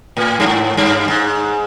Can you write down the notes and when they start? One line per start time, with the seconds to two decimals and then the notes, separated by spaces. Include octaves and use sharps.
0.17 A2
0.40 G2
0.46 G#2
0.77 G2
1.08 G#2